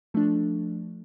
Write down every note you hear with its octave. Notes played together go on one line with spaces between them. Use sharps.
F3 A3 D4